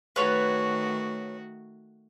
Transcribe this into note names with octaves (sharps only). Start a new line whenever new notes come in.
D#3 A3 F#4 B4 C#5 A5